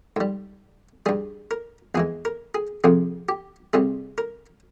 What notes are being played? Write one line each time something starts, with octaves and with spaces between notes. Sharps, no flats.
G#2 G3
G2 G3 G#4
A#4
E2 E3 G#3 G#4
A#4
G#4
F2 C3 F3 G#4
G4
C2 C3 G3 G#4
A#4